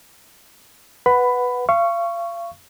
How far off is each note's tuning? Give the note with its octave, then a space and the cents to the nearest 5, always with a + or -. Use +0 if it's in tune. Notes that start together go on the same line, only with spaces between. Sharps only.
B4 +0 F#5 +0 B5 +15
F5 -35 C#6 +0